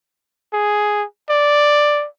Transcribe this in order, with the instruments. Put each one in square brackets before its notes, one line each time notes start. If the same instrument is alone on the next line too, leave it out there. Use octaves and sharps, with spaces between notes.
[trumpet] G#4
D5